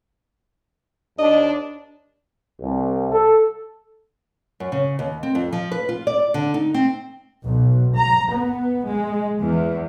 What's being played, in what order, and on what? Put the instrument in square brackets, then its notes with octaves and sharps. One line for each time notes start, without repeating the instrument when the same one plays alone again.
[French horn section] D#2 D4 [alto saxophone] D#5
[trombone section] C2
A4
[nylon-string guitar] F#2
C#3
D#2
C4
F2
F3
B4
F4
D5
D3
D#4
C4
[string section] B1
A#5
B3
G#3
E2